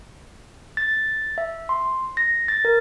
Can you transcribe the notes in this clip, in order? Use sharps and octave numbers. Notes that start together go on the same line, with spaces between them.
A6
E5
C6
A#6
A6
A#4